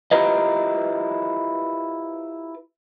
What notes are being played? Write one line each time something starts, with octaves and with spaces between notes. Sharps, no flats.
E4 F4 G4 A#4 B4 D#5